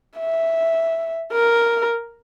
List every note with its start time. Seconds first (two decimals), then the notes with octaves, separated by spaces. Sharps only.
0.19 E5
1.32 A#4